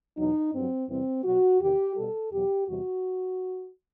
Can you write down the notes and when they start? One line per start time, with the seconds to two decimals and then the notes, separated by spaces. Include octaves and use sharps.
0.17 E2 B2 F#3 D#4
0.53 G2 F#3 C4
0.88 E2 C3 E3 G3 C4
1.24 B2 F#3 F#4
1.59 E2 C3 D#3 G4
1.95 B2 G3 A4
2.31 E2 B2 F#3 G4
2.67 E2 C3 E3 G3 F#4